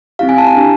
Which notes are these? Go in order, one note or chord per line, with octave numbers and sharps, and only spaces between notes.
C4 E4 G4 F5
G#5
A5
A#5
D4 G4